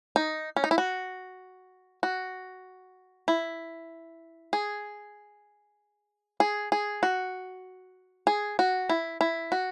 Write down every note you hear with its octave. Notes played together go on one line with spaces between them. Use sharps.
D#4
C#4
D#4
E4
F#4
F#4
E4
G#4
G#4
G#4
F#4
G#4
F#4
E4
E4
F#4